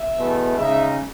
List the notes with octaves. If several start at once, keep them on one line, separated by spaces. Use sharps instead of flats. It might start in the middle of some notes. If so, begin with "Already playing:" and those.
Already playing: E5
E2 B2 A3
C#3 G#3 D#4 E5